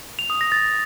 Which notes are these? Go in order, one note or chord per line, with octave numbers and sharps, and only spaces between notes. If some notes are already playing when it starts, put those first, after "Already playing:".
F7
D#6
A#6
A6